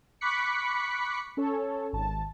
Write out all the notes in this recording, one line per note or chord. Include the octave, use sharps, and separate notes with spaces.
B5 C#6 D6 F#6 B6 C#7
C#4 A4 C#5
G#1 A5